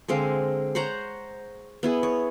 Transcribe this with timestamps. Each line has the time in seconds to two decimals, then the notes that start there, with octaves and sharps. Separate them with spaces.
0.08 D3 G#3 C4 F5
0.75 C5 C#5 F#5 A#5
1.83 B3 E4 G#4
2.03 C#5